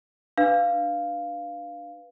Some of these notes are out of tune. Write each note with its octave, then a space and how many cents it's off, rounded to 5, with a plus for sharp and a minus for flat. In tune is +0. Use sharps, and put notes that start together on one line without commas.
D4 +10 B4 +0 F5 +0